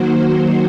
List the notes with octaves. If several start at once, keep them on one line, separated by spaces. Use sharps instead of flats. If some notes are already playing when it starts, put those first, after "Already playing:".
Already playing: D#3 F#3 A#3 F#4 C5